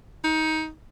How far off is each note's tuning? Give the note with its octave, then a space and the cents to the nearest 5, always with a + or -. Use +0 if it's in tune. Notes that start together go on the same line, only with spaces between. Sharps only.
D#4 +20